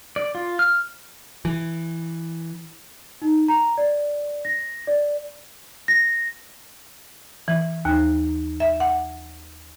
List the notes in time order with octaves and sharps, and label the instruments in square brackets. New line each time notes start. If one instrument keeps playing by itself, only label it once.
[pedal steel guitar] D5
F4
F6
[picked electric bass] E3
[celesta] D#4
A#5
D5
A#6
D5
A#6
[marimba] E3
D#2
E5
F#5